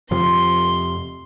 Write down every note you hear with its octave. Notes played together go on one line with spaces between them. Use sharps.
F2 C3 F3 C6